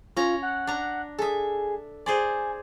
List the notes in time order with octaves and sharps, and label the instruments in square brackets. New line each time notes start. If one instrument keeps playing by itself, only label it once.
[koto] C#4 A#5 [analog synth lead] F4
[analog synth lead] F#5
[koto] D4 A#5
[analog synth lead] G#4 [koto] A4 E5
[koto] G#4 C5 D5 [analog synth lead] G#5